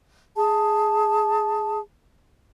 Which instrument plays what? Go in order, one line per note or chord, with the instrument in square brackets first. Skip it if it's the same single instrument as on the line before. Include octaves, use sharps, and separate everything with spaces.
[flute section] G#4 A5